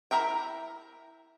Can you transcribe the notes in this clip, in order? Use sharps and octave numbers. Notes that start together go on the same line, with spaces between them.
E4 F#4 A#4 E5 G5